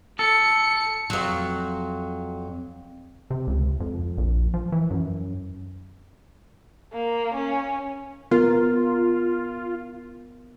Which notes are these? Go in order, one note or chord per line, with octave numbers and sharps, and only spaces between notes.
A4 C#7
F2 F#3
C3
C#2
F2
A#1
F3
E3
F#2
A#3
C#4
B3 F4 A#4